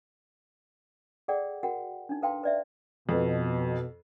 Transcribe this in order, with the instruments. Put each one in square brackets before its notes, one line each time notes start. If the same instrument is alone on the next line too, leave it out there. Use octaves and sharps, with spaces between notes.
[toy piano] G#4 A4 D5 F#5 G5
F#4 A#4 F#5 G5
D4 D#4
A4 B4 F5 G5 A5 C6
B4 D5 E5
[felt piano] F2 [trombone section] B2